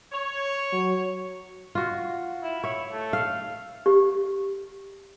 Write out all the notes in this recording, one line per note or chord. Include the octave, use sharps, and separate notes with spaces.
C#5
F#3
F4 F#4
E4
E4 C#5 E5
A3
F5
G4